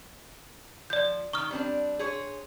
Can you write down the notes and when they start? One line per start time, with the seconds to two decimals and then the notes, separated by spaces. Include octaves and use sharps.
0.90 F3 D5 G6
1.33 D#3 C#6 D#6 F6
1.51 G3 C4 D4
1.99 G#4 C5 C#5